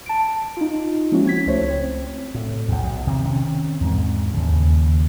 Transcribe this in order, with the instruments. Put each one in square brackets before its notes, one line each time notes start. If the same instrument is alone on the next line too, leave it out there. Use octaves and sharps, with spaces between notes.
[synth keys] A5 D7
D#4 F4
F3 G#3 A#3 C#4 E4 F#4
C4 G#6 B6
C#2 A3 C5 C#5
C4
[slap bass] A2
B1 E2
C3 D#3
D#3 C4 C#4
E2 G#2
D#2 C#3